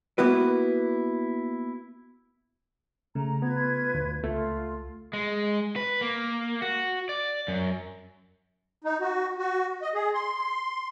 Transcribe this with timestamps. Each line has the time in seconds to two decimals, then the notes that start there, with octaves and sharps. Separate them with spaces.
0.18 A#3 B3 E4 F#4 B4
3.15 C#3 A3 A#5
3.42 B3 F4 B4 G#6
3.94 D2
4.24 C#2 A3 F4
5.13 G#3
5.76 B4
6.01 A#3
6.62 F#4
7.09 D5
7.48 F#2
8.84 D#4
9.01 F#4
9.38 F#4
9.82 D#5
9.95 G#4
10.14 C6